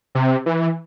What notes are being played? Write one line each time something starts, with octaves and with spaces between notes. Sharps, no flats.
C3
E3